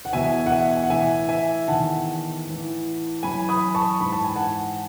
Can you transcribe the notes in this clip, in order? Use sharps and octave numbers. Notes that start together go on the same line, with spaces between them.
F#5
E2 B2 E5 G#5
F#5
E5 G#5
F#5
A2 E3 E5 G#5
E5 G#5
E2 D#3 F#5 A5
A2 E3
F#2 E3 G#5 B5
B5 D#6
A5 C#6
G#2 E3 B5
A5
G#5
F#5 A5